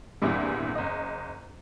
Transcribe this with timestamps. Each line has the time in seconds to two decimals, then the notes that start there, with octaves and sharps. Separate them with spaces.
0.22 G#1 E2 G2 A#2 E3 G3
0.75 F#1 D#5